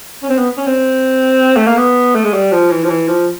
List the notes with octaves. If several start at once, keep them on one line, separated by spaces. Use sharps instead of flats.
C#4
C4
B3
C#4
C4
A3
A#3
B3
A3
G#3
G3
F3
E3
F3
E3
F3